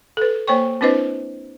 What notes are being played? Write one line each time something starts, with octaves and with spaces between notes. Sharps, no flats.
A4 B4
A#3 C5 C#5 G5 C#6
C4 D4 E4 B4 C5 D#5